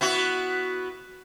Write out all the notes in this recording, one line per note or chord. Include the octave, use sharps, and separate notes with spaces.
B3 E4 F#4